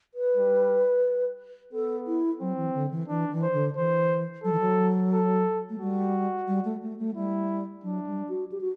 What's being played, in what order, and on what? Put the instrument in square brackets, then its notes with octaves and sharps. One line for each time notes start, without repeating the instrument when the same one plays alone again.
[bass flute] B4
[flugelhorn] G3
[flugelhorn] B3 [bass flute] A4
[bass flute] E4
[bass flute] F#3 [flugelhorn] C4
[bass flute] E3
D3
E3
[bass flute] E3 [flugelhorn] D4
[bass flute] E3
[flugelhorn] C5
[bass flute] D3
[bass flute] E3 [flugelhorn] C5
[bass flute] F#3 [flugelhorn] A4
[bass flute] E3
F#3
[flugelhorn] A4
[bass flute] A3
[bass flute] G3 [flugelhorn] F#4
[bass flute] G3
A3
A3
A3
[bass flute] G3 [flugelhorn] E4
[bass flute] F#3 [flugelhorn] D4
[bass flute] G3
F#4
G4
F#4